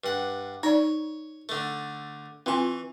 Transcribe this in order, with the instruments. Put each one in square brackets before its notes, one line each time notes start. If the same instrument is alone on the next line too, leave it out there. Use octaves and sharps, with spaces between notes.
[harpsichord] G2 F#5
[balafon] D#4 D5 [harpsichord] C#5
[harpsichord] D3 A3
[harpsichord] E3 C#6 [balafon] C4 F4 G#5